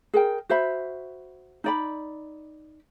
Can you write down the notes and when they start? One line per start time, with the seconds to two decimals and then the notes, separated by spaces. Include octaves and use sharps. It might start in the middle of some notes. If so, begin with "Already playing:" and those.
0.14 G#4 A#4 G5
0.49 F#4 C5 E5 B5
1.64 D#4 D5 B5